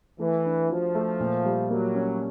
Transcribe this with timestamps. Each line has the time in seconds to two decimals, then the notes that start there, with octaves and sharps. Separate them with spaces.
0.19 E3 A3
0.46 D4
0.70 F3 F#4
0.95 A3
1.20 A#2
1.45 G3
1.70 F#3 A#3
1.95 C#4